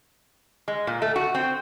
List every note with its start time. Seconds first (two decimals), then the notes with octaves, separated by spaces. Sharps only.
0.68 G#3
0.87 A#2
1.02 A3
1.16 F#4
1.35 C4